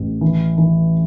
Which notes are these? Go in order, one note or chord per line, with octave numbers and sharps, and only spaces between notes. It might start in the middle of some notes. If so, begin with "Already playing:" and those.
Already playing: A1
E3
E3